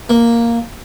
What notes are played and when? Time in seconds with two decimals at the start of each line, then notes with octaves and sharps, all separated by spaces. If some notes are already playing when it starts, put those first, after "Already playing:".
0.10 A#3